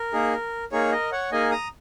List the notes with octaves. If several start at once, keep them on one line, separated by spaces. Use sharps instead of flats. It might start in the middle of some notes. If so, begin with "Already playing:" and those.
Already playing: A#4
A#3 D#4 G#4
A#3 D#4 G#4 C#5
A#4 D#5
C#5 F#5
A#3 D#4 G#4 D#5 G#5
A#5 D#6